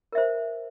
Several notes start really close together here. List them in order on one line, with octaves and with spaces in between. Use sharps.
A#4 E5 C5